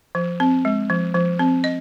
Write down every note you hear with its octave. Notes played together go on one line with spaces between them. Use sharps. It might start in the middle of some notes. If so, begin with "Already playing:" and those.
F3
C4
G#3
F3
F3
C4
D#5